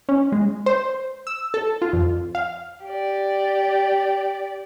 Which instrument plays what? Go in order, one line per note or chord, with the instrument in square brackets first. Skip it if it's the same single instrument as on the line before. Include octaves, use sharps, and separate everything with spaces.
[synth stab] C#4
G#3
C5
E6
A4
F4
F2
F5
[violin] G4 D5